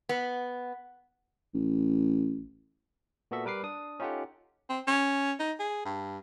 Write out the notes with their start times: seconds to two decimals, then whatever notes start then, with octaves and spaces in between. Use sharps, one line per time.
0.09 B3
1.54 A1
3.31 A#2 B3 F#4 A4 E5
3.45 G3 A#4 B4 D6 C7
3.63 D4 D#6
4.00 C#4 D#4 F4 G4 A4 F#5
4.69 C4
4.87 C#4
5.39 D#4
5.60 G#4
5.85 G2